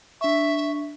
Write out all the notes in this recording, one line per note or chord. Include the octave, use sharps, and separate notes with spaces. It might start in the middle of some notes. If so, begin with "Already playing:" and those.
D4 E5 C#6